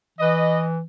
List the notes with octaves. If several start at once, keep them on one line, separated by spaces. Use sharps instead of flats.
E3 B4 D#5